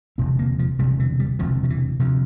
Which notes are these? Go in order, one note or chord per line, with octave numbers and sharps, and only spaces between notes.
E1 D2 C3 C4
A#3
F3
E1 D2 C3 G3
E3
G3
E1 D2 C3 F3
F3
E3
D2 C3 F3